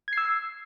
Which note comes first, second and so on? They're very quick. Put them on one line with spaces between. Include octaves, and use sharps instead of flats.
G#6 C7 E6